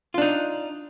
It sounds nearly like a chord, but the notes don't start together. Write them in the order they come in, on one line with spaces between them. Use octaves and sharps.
F4 D4 D#4